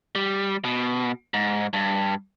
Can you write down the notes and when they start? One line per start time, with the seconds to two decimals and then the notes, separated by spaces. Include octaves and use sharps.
0.15 G3
0.64 B2
1.34 G#2
1.73 G2